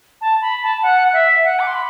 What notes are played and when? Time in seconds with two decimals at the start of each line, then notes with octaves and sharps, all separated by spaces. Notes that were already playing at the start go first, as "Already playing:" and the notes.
0.21 A5
0.41 B5
0.63 A5
0.82 F#5
1.13 E5
1.44 F#5
1.60 D6
1.67 C6
1.75 B5